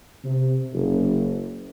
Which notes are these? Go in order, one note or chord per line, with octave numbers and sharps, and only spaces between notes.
C3
F#1